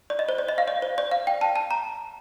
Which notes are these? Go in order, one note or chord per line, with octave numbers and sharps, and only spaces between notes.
D5
D#5
C5
D5
D#5
F5
D5
C5
D5
F5
G5
A5
A5
A#5